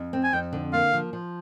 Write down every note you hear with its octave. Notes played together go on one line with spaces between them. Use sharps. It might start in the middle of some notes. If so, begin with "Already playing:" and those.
Already playing: F2
C4
G#5
F2 G5
D3
A#3 F5
F3
F3